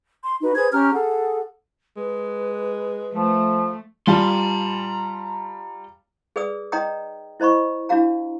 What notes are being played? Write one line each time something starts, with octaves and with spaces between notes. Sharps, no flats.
C6
D#4 F#4 B4
G#4 B4 C5 G#6
C#4 G4 A#5 F6
G#4 A4 F#5
G#3 B4
F3 A3
G3 F4 A5 A#5 C6
G#4 B4 D5 D#6 E6
D#4 C#5 D#5 G5 A#5 D#6
E4 C5 D#5 B5 C#6
D4 E4 F#4 F5 A#5